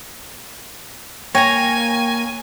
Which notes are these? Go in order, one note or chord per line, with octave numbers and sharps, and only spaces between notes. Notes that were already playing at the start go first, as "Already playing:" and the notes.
A#3 C#5 G5 G#5 A#5 A#6